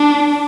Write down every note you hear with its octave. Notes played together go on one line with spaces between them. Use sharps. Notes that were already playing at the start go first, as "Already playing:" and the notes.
Already playing: D4